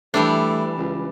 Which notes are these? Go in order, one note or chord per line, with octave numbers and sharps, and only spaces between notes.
E3 G3 A3 D4
C#2